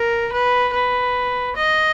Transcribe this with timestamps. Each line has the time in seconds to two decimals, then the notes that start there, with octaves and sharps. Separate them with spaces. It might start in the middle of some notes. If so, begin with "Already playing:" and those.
Already playing: A#4
0.33 B4
0.74 B4
1.56 D#5